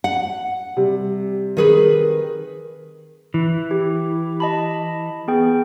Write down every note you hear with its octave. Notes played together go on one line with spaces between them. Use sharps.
F#5
C3 G3
D#3 G#4 B4
E3
G4
D#5 A5 B5
B3 G#4 G5